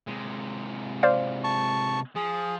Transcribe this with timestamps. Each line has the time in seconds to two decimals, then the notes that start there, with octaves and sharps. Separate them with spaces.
0.07 C3 G#3
1.03 C5 D5 F5
1.44 A5 C#6
2.16 F3 G#4